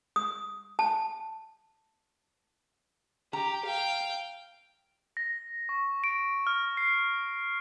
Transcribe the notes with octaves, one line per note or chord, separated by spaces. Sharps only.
D#6
A5
G4 A#5
F5 G5
A#6
C#6
D7
F6
C7